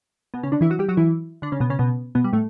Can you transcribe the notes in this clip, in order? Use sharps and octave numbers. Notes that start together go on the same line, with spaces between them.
B2 B3
C#3 C#4
D3 D4
E3 E4
F#3 F#4
G3 G4
F#3 F#4
E3 E4
D3 D4
C#3 C#4
B2 B3
C#3 C#4
B2 B3
B2 B3
G3
A2 A3